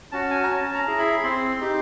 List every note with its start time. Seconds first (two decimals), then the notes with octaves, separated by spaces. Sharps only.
0.12 C#4 F#4 A5
0.31 G#5
0.44 A#5
0.49 C#4 A5
0.74 A#5
0.87 E4 G#4
0.99 B5
1.23 C4 C6
1.61 D#4 G4